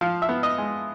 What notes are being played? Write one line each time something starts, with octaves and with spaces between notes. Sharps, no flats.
F3 F5
E5
B3
D#5
G#3